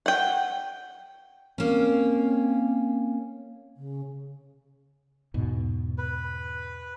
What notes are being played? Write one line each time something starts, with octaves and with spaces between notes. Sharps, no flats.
F#5 G5
A#3 C4 C#4
C#3
E2 G#2 B2
B4